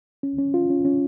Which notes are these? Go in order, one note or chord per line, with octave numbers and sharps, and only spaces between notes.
C#4
C#4
F4
C#4
C#4